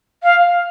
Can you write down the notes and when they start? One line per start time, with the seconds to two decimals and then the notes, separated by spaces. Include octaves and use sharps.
0.23 F5